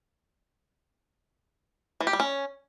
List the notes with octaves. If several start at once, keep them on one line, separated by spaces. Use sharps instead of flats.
E3
G4
G3
C#4